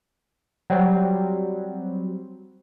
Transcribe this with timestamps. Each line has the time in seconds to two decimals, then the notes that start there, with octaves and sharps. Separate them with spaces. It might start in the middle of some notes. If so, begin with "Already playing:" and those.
0.70 F#3 G3 C4